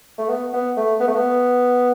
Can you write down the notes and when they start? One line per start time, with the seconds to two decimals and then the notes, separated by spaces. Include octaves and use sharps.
0.19 A3
0.29 B3
0.53 B3
0.77 A3
1.00 B3
1.07 A3
1.15 B3